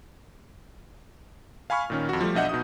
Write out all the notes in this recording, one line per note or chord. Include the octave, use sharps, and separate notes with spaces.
F5 G#5 B5 C#6 F6
A#2 D#3 C#4
F2 F#4
F3 G3 A3
B1 D4 D#5 E5 F#5 G6
B2 D#4 F#4 D#6